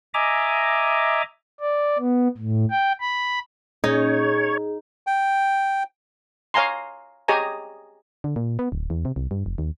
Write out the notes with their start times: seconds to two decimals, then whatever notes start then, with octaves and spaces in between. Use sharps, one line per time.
0.14 D#5 E5 G#5 A#5 D6
1.60 D5
1.99 B3
2.38 A2
2.70 G5
3.00 B5
3.84 A#2 C#4 D#4 G#4 C#5
5.07 G5
6.54 C#5 F5 G#5 A#5 C6
7.28 G4 G#4 C#5 D#5 G#5 A#5
8.24 D3
8.36 A#2
8.59 B3
8.72 D1
8.90 E2
9.05 C3
9.16 C2
9.31 G2
9.46 F1
9.58 D#2